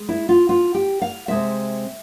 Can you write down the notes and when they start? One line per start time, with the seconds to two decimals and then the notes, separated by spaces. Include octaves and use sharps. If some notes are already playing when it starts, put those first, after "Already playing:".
Already playing: G#3
0.09 E4
0.29 F4
0.49 F4
0.74 G4
1.02 F5
1.28 C3 E3 G#3 C4 E5